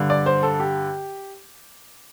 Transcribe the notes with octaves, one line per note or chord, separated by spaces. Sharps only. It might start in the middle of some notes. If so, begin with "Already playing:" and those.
Already playing: G2 D3
D5
C5
A4
G4